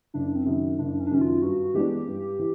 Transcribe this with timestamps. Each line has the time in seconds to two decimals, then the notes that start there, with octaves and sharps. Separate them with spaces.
0.14 F#1 D4
0.36 C4
0.46 F#2 D#3
0.78 F#1 D4
1.00 C#4
1.07 D4
1.11 F#2 D#3 C#4
1.21 F4
1.42 G2 F#4
1.74 E3 G#3 B3 D4 G4
2.07 G2
2.39 E3